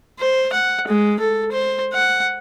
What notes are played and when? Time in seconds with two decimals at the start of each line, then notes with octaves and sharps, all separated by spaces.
0.19 C5
0.53 F#5
0.88 G#3
1.20 A4
1.52 C5
1.93 F#5